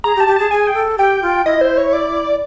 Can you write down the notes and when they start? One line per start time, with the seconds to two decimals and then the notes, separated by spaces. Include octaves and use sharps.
0.04 G#4 A#5
0.16 G4
0.20 A5
0.27 G4
0.36 G#4 A5
0.51 G#4 G#5
0.67 G5
0.75 A4
0.98 G4 G5
1.22 F4
1.46 E4 D#5
1.61 C5
1.77 C#5
1.93 D5